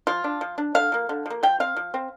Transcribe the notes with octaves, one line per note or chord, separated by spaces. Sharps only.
F3 F4
D4
F3
D4
D3 F5
F3 A#3
D3
F3 A#3
F3 G5
C4 F5
F3
C4